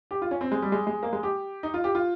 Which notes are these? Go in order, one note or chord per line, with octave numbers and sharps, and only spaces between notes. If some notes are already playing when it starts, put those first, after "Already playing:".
G4
F4
C#4
C4
G#3
G3
G#3
G#3
A#3
G#3
G4
D#4
F4
G4
F4